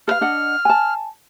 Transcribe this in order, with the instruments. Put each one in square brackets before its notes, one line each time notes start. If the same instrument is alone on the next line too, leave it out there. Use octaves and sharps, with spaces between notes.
[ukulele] A4 B4 F5 [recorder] F6
[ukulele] D4 D#5 F#5
G#5 A5